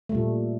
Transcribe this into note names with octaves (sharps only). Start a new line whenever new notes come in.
A#2 G3 A3